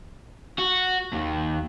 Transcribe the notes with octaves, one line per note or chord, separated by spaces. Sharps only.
F#4
D#2